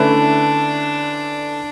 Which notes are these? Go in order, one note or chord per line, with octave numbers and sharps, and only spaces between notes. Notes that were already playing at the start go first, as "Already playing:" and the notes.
Already playing: D3 A3 C#4 D4 E4 B4